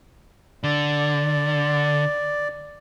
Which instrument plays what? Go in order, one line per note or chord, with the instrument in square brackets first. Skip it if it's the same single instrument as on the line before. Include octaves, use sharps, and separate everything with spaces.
[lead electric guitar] D3 [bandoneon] D5